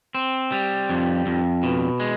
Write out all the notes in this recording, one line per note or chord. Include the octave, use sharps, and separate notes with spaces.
C4
G3
F2
F2
B2
G#3